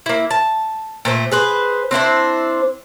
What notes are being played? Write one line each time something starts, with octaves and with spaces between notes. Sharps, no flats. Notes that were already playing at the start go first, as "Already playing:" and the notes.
A#3 E4
A5
A#2 A3 C5
G#4 B4 C5
C4 D4 E4 C5